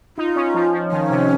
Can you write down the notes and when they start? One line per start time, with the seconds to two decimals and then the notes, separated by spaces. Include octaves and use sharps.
0.17 D#4 F4
0.36 C#4
0.54 F3
0.73 F3
0.91 D#3 C#4
1.10 C3